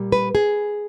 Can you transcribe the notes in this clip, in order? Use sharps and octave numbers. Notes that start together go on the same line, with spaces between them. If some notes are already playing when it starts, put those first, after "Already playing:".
Already playing: A#2 G3
B4
G#4